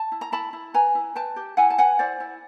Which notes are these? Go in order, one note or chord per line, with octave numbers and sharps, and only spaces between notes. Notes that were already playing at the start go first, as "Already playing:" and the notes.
Already playing: A5
E4
A#5
E4 A5 B5
E4
B4 G#5 A#5
E4
B4 G5 A5
G4
E4 F#5 G#5
A5
B4 F#5 G#5
E4 C5 D5
E4